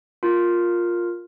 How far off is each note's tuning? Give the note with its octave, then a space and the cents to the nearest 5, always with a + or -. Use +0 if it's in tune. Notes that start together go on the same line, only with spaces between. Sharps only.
F4 +5 A#4 +0